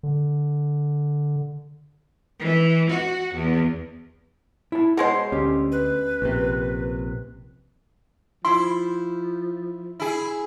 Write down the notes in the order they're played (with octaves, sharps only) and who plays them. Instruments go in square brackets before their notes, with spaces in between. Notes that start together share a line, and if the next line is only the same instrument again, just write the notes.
[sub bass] D3
[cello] E3
F#4
E2
[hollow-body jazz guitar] E4 A5
[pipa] B2 G#3 C5 [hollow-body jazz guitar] G#4 C#5
[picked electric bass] D2 [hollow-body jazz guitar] C#4 G4
[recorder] B4
[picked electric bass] A#1 C3
[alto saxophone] F3 [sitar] E4 [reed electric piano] C6
[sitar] E4 G#4